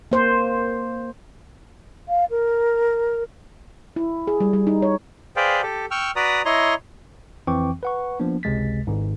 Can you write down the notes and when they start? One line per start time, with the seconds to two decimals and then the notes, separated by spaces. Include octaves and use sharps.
0.12 A#3 C5
2.08 F5
2.30 A#4
3.96 E4
4.27 G#4
4.40 G3
4.53 G3
4.67 D#4
4.82 C#5
5.36 G#4 B4 C5 D5 F5 G5
5.62 G4 A4
5.91 G5 C#6 E6 F6
6.16 F#4 B4 D5 A#5 D#6
6.45 E4 C#5 D#5 A#5 C6
7.47 F2 E3 C4 G5 C#6 D6
7.83 B4 F#5 C#6
8.20 F3 A#3 B3 D4
8.43 G1 C#2 C3 G#3 A6 B6
8.87 G#1 G#2